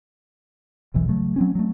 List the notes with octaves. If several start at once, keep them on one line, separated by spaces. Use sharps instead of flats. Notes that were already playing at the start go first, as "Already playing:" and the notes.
E1 B1 E3
C#3 F#3 A3
F#3 C4 C#4
F#3 A3